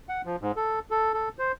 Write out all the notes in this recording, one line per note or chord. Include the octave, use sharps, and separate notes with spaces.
F#5
F3
G#2
A4
A4
A4
C5